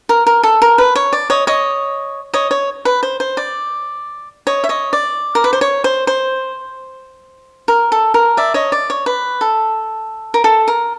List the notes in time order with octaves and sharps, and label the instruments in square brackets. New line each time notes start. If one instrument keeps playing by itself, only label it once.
[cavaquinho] A#4
A#4
A4
A#4
B4
C#5
D5
C#5 D#5
C#5 D#5
C#5 D#5
C#5
B4
C5
C5
D5
C#5 D#5
E5
C#5 D#5
D5
A#4
B4
C5
C#5
C5
C5
A#4
A4
A#4
D5 E5
C#5 D#5
D5
C#5
B4
A4
A#4
A4
A#4